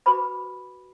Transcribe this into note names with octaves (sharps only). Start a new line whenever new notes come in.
F#4 G4 B4 C5 B5 D6